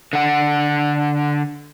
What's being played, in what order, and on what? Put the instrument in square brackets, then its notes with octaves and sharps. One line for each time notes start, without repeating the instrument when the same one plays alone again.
[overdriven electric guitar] D3 F#5